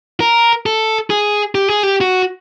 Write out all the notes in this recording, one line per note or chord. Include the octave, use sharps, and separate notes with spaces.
A#4
A4
G#4
G4
G#4
G4
F#4